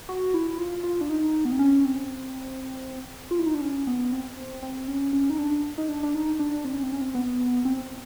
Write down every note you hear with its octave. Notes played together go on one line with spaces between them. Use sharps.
F#4
E4
F4
F4
D4
D#4
B3
C4
C#4
C4
F4
E4
D#4
D4
C#4
B3
C4
C4
C4
C#4
C#4
D#4
D4
D#4
D4
D4
D#4
D4
C4
C#4
C4
C#4
C4
B3
C4